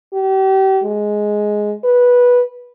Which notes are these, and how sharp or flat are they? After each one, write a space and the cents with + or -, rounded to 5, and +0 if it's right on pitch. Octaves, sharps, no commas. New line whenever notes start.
G4 -35
G#3 +5
B4 -10